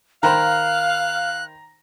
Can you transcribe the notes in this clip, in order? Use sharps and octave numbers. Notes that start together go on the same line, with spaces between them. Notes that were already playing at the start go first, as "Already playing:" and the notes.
D#3 C5 F5 A#5 B5 F#6